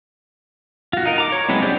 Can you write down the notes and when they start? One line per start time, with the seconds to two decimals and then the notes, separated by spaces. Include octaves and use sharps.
0.93 F4 F#4
1.06 D#4 A#4
1.18 A#5 D6
1.32 C#5
1.49 F#3 G#3 B3 C4 E4
1.62 D4 G4 G#4 C5 D5